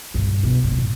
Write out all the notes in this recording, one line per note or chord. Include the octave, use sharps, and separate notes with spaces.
G2 A#2
B2
G#2
A#2